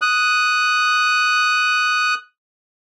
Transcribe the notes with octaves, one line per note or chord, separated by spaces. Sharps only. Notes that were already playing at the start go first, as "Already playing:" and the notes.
D#6 F#6